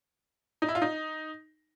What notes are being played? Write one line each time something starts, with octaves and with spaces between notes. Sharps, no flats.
D#4
E4
F4
D#4